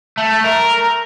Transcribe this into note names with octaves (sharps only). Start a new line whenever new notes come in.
A3
A#4